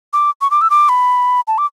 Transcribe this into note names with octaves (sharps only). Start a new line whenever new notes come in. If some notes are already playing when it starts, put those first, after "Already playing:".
D6
C#6
D6
E6
D6
B5
A5
D6